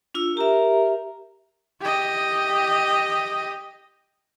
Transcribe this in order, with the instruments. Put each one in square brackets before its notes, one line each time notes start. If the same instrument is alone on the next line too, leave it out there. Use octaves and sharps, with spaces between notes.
[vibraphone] D4 F4 E6
[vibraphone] G4 E5 [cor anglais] A#4
[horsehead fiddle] G4 D#5